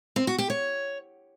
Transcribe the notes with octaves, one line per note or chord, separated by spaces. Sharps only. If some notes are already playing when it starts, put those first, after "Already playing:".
C4
F#4
G4
C#5